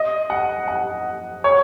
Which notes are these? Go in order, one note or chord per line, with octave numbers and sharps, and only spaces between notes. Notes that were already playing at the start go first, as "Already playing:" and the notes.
Already playing: D#5
F#5
F#5
C#5